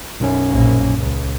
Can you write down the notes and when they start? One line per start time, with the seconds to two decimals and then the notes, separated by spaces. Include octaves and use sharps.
0.20 B1 F#2 C#4
0.50 A#1 A#3
0.98 C#2